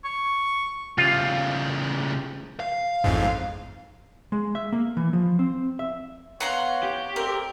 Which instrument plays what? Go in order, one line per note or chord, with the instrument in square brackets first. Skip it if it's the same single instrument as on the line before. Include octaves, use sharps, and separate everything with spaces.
[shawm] C#6
[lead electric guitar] C#3 G3 [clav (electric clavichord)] F4
[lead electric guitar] F5
[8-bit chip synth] A1 F2 G#2
[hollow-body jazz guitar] G#3
E5
A#3
E3
F3
C4
E5
[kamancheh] B3 F5 [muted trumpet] C#5 [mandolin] F#5 A#5 C6
[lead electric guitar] G4
[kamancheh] A3 D5 [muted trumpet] C4 [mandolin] A#4